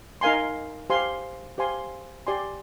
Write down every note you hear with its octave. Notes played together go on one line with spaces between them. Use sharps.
D#4 A#4 F5 G#5 C6
G4 C5 F5 G#5 C6
G4 C5 F5 G#5 C6
G4 D5 G#5 C6